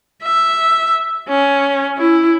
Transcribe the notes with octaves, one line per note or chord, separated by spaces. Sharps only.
E5
C#4
E4